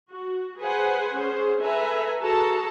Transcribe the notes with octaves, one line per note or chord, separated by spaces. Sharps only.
F#4
G#4 B4 C5 F#5 G#5
C#4 G#4 C5
A4 B4 E5 G#5 A#5
F#4 G#4 A4 A5 A#5